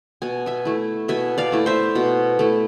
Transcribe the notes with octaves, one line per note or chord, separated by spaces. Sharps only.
B2 G#5
E5 G#5
A3 E4
B2 E5 G#5
D5 F5
A3 E4
C5 E5
B2
A3 E4